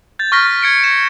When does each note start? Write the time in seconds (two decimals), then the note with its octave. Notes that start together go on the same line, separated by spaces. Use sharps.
0.19 G6 A6
0.32 C#6 F6 A#6 B6
0.62 G#6 C#7 D7
0.84 G#6 C#7 E7